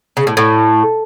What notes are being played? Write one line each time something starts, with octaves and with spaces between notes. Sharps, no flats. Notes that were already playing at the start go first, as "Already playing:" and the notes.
C#3
A2
A2